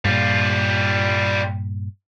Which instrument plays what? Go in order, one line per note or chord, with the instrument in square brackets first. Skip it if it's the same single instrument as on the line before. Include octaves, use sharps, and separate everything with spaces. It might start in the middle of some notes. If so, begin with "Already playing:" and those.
[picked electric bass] G2 A#2 [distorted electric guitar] G3 F4